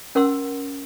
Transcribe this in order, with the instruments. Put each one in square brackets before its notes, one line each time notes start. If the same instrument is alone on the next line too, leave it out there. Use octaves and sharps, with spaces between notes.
[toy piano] C#4 A#4 F#5 C6 E6